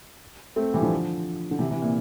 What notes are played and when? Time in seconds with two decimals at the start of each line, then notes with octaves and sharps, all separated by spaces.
0.56 A3 C4
0.74 E3 G3
0.82 D3 F3
1.51 D3
1.59 C3 E3
1.71 C3 E3
1.82 A#2